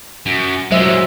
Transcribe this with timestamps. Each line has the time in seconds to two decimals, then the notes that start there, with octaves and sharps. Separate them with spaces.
0.26 F#2
0.71 A#2 F#3 G#3 C5 E5